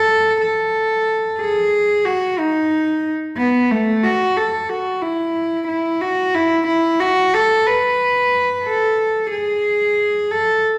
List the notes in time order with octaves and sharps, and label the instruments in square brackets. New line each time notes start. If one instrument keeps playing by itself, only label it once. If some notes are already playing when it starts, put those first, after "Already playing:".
Already playing: [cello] A4
A4
G#4
F#4
D#4
B3
A3
F#4
A4
F#4
E4
E4
F#4
E4
E4
F#4
A4
B4
A4
G#4
A4